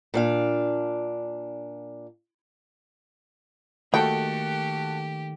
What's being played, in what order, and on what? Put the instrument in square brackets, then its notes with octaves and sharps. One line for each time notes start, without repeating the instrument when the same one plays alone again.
[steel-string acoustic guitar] A#2 D4 F5
[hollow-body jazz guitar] D#3 A3 A#3 [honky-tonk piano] F#4 A4 [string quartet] G4 [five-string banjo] G5